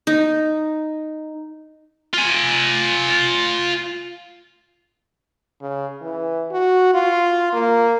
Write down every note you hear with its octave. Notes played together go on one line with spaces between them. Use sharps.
D#4
F4 G#5
C#3
E3
F#4
F4
A#3